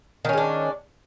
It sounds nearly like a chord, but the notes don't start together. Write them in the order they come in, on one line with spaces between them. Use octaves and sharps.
D#3 C#4 G#3 D4